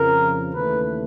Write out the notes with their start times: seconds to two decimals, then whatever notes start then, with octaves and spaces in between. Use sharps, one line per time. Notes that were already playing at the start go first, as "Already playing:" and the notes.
Already playing: F2 C#3 F3 A#4
0.54 D#2 C#3 E3 A3 B4